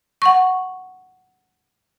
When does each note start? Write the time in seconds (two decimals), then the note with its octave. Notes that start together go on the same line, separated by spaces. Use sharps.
0.22 F#5 C#6